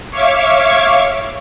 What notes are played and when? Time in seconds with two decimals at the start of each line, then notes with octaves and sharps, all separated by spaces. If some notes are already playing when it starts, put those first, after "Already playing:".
0.11 C#5 E5 F5 C#6 D6 G#6